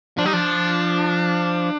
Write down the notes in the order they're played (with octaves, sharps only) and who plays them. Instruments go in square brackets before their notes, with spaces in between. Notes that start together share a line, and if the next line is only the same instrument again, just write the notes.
[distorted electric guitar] F3 [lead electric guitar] D4
[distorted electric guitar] G3 [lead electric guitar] D#4
[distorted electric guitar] F3 [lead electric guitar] D4